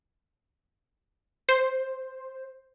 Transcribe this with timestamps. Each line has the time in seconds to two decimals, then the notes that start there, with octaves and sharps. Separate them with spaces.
1.49 C5